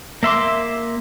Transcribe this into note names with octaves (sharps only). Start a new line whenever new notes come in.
A#3 E5 C6 D6